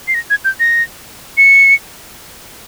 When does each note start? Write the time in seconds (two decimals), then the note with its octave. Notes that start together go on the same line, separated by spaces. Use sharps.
0.08 C7
0.14 A#6
0.30 G#6
0.44 G6
0.60 A#6
1.38 C#7